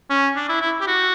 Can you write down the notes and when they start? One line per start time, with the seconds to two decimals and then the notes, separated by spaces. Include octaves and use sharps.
0.10 C#4
0.36 D4
0.49 E4
0.61 E4
0.81 G4
0.87 F#4